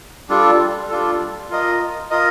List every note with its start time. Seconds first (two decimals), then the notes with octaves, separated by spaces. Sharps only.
0.29 G3 D4 F4 A4
0.90 G3 D4 F4 A4
1.50 F4 A#4 D#5
2.10 F4 A#4 D#5